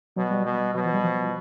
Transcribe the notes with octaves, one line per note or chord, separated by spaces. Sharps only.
B2 F#3
G3
B2
B2 F#3
F3
G3
F3